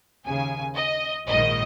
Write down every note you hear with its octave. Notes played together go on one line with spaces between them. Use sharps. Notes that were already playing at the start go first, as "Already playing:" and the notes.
D#2 C#3 G#5
D#5
A#1 G#2 D#3 D#5